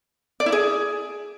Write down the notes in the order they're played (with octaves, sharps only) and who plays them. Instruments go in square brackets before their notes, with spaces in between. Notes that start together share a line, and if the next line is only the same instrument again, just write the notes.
[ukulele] D5
E4
G#4